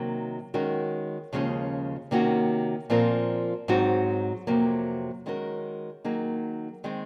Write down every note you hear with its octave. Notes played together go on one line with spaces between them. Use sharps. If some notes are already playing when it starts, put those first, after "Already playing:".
Already playing: C3 D#3 F#3 A#3 D#4
D#3 G#3 C#4 F#4 A#4
D#2 C#3 F3 G#3 C#4
C3 D#3 A#3 C#4 F#4
A#2 F3 C4 F4 A#4
G#2 F#3 C4 D#4 F#4
F2 C3 F#3 A#3
D#3 G#3 C#4 F#4 A#4
D#3 F#3 A#3 D#4 G#4
D#3 G#3 C4